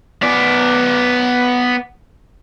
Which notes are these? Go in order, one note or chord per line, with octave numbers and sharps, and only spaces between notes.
B3 D5